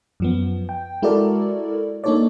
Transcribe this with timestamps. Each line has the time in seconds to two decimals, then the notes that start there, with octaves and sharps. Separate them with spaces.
0.20 F#2 F3 B3
0.69 G5
1.02 G#3 E4 F#4 A4 A#4 D5
2.04 A#3 D4 D#4 A4 C#5 D5